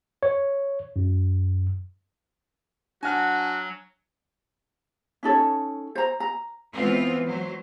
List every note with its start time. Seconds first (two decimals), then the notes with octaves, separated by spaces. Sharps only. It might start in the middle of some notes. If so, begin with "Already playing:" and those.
0.23 C#5
0.96 F#2
3.03 F#3 D4 F#4 F#5 G#5 A5 F6
5.23 C#4 D#4 A4 C#5
5.95 C5 A#5
6.20 A#5
6.74 E3 G#3 B3 C4 F4
7.27 F#3 C5